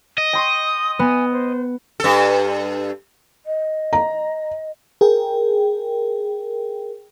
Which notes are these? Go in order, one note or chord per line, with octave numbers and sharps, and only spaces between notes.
D#5
G5 C6 C#6 D#6
B3 G#5
C5
G2 A4
D#5
A#5
G#4 A#4 G5